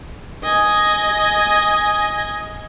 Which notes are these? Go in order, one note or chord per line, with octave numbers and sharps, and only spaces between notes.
D#5 G#5